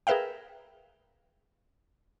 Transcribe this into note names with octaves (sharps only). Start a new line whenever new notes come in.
G#4 A#4 B4 E5 F5 G5